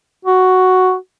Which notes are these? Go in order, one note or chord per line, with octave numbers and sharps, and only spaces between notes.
F#4